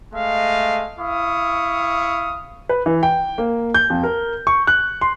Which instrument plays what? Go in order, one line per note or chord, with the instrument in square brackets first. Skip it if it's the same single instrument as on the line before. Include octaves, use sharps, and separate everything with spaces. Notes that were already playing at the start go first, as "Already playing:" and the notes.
[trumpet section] G#3 A3 D#5 F5
E4 F5 C#6 D#6
[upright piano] B4
E3
G5
A#3
G6
F2
A#4
C#6
F#6
C6